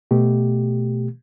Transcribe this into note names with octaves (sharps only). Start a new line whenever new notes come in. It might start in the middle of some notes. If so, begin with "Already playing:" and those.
B2 A3 G4